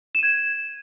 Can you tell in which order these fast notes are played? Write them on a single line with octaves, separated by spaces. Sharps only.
E7 D#7 G#6